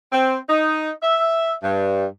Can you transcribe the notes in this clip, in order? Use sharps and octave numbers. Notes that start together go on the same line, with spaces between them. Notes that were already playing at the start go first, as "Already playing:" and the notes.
C4
D#4
E5
G2